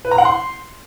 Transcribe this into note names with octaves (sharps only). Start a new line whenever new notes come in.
B4
A#5
F#5
C6